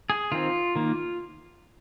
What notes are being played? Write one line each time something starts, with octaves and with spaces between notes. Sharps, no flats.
G#4
D#3 C4 F4
D#3 A#3